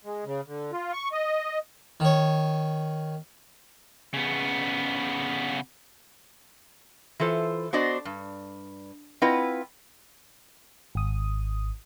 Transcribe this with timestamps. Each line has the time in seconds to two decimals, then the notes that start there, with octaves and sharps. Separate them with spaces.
0.05 G#3
0.25 C#3
0.47 D3
0.72 F4
0.93 C#6
1.12 D#5
2.00 D#3 C#5
4.14 C#3 B3
7.20 E3 F4 A4 C5
7.73 B3 D4 F#4 C5 D5 D#5
8.05 G2
9.22 C4 E4 F4 B4 D#5 F#5
10.95 G#1 D#6